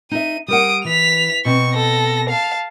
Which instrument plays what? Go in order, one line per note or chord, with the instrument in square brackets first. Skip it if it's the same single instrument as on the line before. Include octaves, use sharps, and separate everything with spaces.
[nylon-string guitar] D#4 E5 [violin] D#7
[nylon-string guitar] G3 A#4 F#5 [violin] D#6 D7
[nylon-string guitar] E3 [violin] B6 F7
[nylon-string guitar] B2 C4 [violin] C#6
[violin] A4 A#6
F5 A5